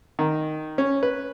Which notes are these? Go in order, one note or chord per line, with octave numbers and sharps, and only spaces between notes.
D#3
C#4
B4